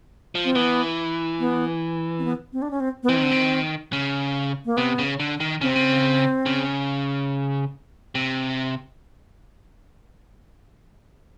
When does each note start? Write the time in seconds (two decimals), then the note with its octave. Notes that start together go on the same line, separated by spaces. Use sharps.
0.35 F3
0.45 C4
0.55 E3 B3
1.40 B3
2.19 C4
2.25 B3
2.53 C4
2.62 D4
2.71 C#4
2.80 C4
3.03 B3
3.09 E3 C4
3.16 D#3
3.23 D3
3.31 D#3
3.93 C#3
4.65 A#3
4.77 C3 B3
4.99 C#3
5.20 D3
5.40 D#3
5.61 C#3 C4
5.69 C3
5.76 C#3
6.46 C#3
8.15 C3